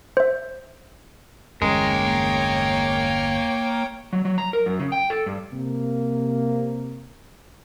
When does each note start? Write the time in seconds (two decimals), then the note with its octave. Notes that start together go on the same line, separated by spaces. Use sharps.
0.17 C5 E5
1.62 G1 E2 G#3 A#3 C#4 A#4 C#5 G5
4.13 F#3
4.25 F#3
4.38 A#5
4.53 A#4
4.66 F#2
4.79 C#3
4.92 G5
5.10 A4
5.26 G2
5.53 C3 A#3